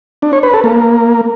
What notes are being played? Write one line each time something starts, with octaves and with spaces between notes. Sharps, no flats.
D4
C#5
B4
A4
A#3